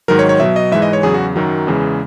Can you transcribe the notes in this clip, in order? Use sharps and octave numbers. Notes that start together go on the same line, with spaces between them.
G#2 D#3 F#3 A#4
C#5
C#5
B2 F#3 E5
D#5
G#2 E3 G#3 E5
D#5
C#5
E2 C#3 F#3 G#4
F#4
F#2 D#3 F#3
E2 C#3 E3 G#3